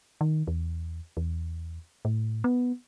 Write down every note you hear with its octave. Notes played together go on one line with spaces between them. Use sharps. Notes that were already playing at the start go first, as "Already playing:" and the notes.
D#3
E2
E2
A2
B3